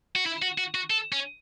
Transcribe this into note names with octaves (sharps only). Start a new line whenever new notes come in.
F#4
E4
F#4
F#4
F#4
A4
C#4